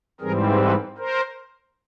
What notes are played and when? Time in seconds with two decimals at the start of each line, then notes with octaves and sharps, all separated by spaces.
0.21 G#2 E3 G3 C4 G#4 A#4
0.59 A4 B4
0.98 A#4 C5